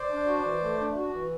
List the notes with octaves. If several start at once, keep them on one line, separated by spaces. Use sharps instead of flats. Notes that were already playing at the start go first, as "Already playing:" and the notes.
Already playing: C5 D5
D4
F#4
E3
A3
D4
F#4
E3